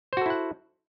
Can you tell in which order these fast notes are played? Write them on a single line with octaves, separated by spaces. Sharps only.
C5 F#4 A4 E4 F#5